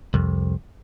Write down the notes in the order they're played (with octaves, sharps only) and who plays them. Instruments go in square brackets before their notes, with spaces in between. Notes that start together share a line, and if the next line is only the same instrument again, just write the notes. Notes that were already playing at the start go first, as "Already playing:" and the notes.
[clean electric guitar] C2 F2